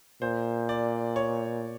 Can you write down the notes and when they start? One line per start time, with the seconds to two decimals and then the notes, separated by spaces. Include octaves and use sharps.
0.22 A#2 C5
0.69 D5
1.16 C#5